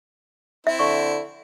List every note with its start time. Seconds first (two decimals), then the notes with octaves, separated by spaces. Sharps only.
0.67 C4 E4 E5
0.79 D3 C#6